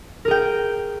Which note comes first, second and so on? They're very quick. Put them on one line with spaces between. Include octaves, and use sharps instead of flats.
A#4 G#4 G5